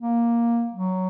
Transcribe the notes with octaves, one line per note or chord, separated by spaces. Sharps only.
A#3
F#3